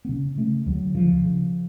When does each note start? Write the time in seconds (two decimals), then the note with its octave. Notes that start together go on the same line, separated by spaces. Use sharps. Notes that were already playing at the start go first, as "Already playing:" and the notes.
0.05 B3
0.09 C#3 C#4
0.37 C#3 A3
0.66 D2 F#3
0.95 C#3 F3
1.24 C#3